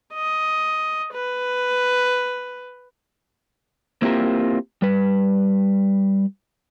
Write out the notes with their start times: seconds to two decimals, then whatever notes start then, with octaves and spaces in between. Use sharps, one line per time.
0.14 D#5
1.13 B4
4.02 A#3 C4 E4 F4 G4 A#4
4.82 G3 B4